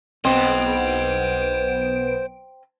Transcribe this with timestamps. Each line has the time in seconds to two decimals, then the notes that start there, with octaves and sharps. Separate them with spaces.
0.25 B1 B3 C4 C5 D#5 D7